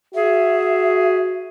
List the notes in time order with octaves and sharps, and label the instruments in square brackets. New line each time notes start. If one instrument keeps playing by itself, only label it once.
[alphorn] F#4 [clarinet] G#4 [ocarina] E5